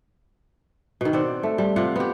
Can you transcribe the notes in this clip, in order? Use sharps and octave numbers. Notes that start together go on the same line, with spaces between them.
B2 D#3
C4 D5 F#5
A3
G3
C3 F4 F#5
B3 G4